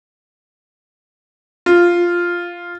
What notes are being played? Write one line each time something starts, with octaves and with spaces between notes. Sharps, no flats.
F4